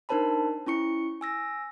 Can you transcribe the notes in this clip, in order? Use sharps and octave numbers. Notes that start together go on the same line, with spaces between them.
D4 D#4 A#4 C5 A5 B5
C#4 E4 C#6 C#7
G#5 E6 A#6